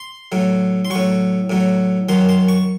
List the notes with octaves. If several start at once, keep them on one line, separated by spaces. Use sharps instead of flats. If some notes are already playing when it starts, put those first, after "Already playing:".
Already playing: C6
A2 F#3
C6
A2 F#3 C#6
A2 F#3
F#2 D#3 F#3 C6
C6
C#6